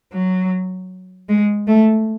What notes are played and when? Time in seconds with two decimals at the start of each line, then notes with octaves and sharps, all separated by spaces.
0.13 F#3
1.29 G#3
1.68 A3